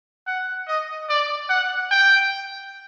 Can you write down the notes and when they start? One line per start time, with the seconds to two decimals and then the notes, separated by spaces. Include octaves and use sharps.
0.27 F#5
0.67 D#5
1.09 D5
1.49 F#5
1.91 G5